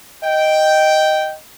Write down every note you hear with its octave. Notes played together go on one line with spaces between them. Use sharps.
D#5 G5